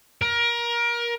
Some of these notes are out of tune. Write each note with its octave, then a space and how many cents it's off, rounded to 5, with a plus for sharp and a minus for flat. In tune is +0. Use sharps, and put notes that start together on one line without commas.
A#4 +25